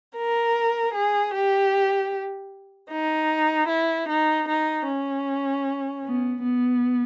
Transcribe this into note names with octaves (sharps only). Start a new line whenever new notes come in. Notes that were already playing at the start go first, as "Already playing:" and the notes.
A#4
G#4
G4
D#4
E4
D#4
D#4
C#4
B3
B3